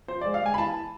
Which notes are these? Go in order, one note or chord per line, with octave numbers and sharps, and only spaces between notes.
F3 C5
G#3 D5
F5
G#3 G#5
B5
E3 A5